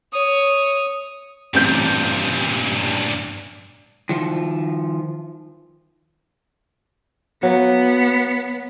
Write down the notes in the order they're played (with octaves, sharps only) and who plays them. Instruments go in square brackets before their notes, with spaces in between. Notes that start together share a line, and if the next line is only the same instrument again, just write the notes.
[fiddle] C#5 [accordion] D#6
[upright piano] A1 C4 G6 [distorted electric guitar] G2 A#2
[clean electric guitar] D#3 F3
[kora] F#3 A#3 [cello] B3